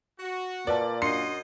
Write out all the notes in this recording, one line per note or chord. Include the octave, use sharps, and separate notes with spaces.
F#4
A#2 A#4 B4 D5 A5
F#2 D4 F#4 D#5 C6 C7 C#7